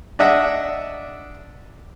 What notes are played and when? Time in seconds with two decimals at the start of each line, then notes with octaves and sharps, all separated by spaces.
0.19 D4 D#5 E5 F#5